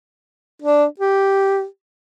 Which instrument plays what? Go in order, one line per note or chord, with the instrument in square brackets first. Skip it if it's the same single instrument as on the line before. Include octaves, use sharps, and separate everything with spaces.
[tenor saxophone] D4
G4